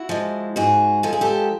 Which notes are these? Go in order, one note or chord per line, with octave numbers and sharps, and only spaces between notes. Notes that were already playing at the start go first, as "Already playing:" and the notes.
Already playing: E4 F#4
F3 G#3
G#2 F#4 G#4
F3 G#3 A4
G#4
G4 A4